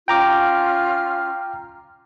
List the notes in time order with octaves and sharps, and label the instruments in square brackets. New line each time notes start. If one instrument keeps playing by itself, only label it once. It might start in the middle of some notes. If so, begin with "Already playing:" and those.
[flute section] C#4 F4 F6 [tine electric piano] G5 A#5 D6